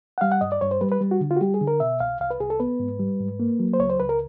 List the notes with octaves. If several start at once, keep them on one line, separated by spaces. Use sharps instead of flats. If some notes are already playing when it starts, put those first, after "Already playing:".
F#5
G3 F5
F#5
G2 D#5
D5
G2 C#5
C5
G3 B4
B4
G3
F#4
D3
F4
F#4
G3 G4
G#4
D3
A#4
B2 E5
C2 F5
C2 F5
B4
C2 G#4
A4
B3 B4
G#2
G3
G#2
A#3
F#3
C5
C#2 C#5
C5
C#2 B4
A#4